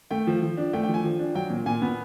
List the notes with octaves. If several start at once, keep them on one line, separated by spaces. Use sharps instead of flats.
A3 G5
F3
F3
D4
A3 G5
G5
F3
G#5
F3
D4
F#3 G5
A#2
A#2 G#5
B3